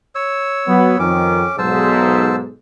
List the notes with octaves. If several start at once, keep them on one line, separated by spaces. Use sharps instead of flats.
C#5 E6
F#3 B3
F2 D#3 C#4 D6
B1 G#2 C5 A5 E6